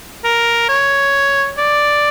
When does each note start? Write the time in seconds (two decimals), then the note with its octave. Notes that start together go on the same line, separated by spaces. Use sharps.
0.24 A#4
0.69 C#5
1.58 D5